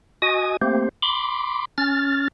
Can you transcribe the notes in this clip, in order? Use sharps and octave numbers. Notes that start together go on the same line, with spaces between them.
F#4 D#5 G#5 D#6
A3 A#3 C4 G4 C5
B5 C6 D6
C#4 F6 A6